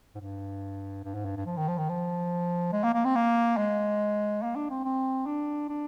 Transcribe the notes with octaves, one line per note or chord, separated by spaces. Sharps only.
G#2
G2
G2
G#2
G2
G2
F3
D#3
F3
D#3
F3
G#3
A#3
A#3
C4
A#3
G#3
A#3
D4
C4
C4
D4
D4